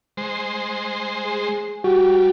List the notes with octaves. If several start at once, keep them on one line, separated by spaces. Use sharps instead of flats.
G#3 C5
G#4
G3 F#4 G4